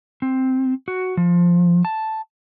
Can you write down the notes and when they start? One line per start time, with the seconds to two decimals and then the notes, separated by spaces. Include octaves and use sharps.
0.22 C4
0.88 F#4
1.17 F3
1.85 A5